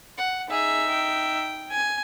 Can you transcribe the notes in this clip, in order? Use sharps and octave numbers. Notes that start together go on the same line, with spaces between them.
F#5
D#4 G#4 E5
G5
G#5